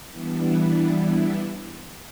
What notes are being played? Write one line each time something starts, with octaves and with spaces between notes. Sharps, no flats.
E3 G3 B3 D4 E4